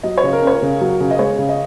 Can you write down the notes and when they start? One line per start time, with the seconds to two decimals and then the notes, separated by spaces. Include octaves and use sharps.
0.03 F#3 D#5
0.18 C#5
0.23 C#3
0.33 A#4
0.42 C#4 C#5
0.62 C#3
0.81 F#3
1.00 C#3
1.11 D#5
1.19 G#3 C#5
1.38 C#3
1.49 D#5